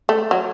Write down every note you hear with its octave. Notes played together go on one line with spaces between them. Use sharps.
A3
F#3